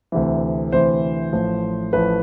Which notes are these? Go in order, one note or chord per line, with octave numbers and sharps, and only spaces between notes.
D2 C3 E3
D2 C3 E3 C5
A1 A2 F3
A1 A2 F3 B4